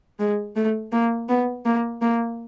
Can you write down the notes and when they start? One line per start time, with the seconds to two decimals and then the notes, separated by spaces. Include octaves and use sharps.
0.19 G#3
0.56 A3
0.92 A#3
1.29 B3
1.65 A#3
2.02 A#3